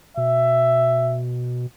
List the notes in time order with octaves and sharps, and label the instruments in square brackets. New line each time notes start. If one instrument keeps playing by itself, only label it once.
[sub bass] B2 [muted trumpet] E5